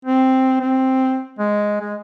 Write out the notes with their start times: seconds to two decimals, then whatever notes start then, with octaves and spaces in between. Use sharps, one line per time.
0.05 C4
0.60 C4
1.39 G#3
1.80 G#3